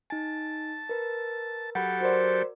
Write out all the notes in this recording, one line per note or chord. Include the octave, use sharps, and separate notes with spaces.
D#4 G#5 A5
A#4 B4
F#3 G4 A4 F#5 B5
F#4 A#4 C5 D5